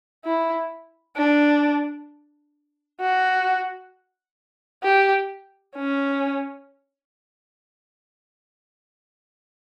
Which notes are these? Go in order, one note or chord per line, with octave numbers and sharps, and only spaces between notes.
E4
D4
F#4
G4
C#4